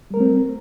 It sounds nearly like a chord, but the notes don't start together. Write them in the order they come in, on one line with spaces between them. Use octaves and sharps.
G3 A#4 A3 C4